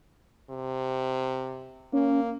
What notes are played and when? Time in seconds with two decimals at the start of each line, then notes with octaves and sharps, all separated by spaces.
0.50 C3
1.93 A#3 C#4